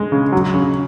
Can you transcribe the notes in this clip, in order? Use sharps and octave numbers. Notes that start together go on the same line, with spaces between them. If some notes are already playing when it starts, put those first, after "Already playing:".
Already playing: G#3
C#3
F#3
C#3